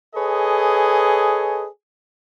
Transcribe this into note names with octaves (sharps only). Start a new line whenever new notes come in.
G#4 A4 B4 C#5 D#5 G#5